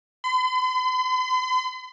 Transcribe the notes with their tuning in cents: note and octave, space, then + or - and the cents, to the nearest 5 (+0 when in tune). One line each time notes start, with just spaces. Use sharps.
C6 -45